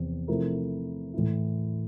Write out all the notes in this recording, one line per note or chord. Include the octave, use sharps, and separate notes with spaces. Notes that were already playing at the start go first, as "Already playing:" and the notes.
Already playing: E2 C3 F3 C4
C3 F3 A3 E4 A#4
A2 E3 A3 E4